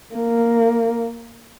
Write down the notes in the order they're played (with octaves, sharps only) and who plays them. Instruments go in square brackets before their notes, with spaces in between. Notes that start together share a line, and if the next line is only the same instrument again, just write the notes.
[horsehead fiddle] A#3